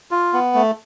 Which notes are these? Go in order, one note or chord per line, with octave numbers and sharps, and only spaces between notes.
F4
B3
A3